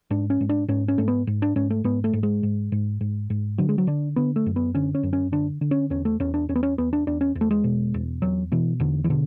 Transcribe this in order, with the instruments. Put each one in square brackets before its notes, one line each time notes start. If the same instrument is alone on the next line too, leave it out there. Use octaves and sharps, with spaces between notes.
[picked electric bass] G#2 D4
C#4
G#2
D4
G#2 C#4
C#4
G#2 A3
B3
G#2
D4
G#2 C#4
A3
G#2 B3
A3
G#2
G#3
G#2
G#2
G#2
G#2
D3 F#3
G#3
F#3
D3 D4
D3 B3
A3
F#2
B3
D3 C#4
C#4
F#2
C#4
D3 D4
D3
C#4
E2 C#4
A3
E2 C#4
D4
E2 C#4
B3
C#4
E2 B3
D4
E2 D4
C#4
E2
A3
G#3
B2
E2
E2 F#3
B2 E3
E2 D3
E3
B2 D3